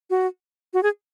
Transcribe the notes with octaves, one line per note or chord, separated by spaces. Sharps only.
F#4
F#4
G#4